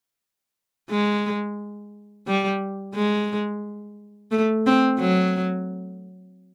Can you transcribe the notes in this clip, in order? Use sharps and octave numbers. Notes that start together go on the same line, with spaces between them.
G#3
G3
G#3
A3
C4
F#3